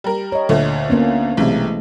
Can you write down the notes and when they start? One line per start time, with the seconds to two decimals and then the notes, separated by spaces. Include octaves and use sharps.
0.04 G3 A#4
0.32 C#5 D#5
0.49 D2 A#2 A3
0.90 A#3 B3 C#4
1.37 B1 C3 E3 G#3 A3